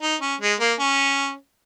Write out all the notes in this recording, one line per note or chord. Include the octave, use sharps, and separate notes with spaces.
D#4
C#4
G#3
A#3
C#4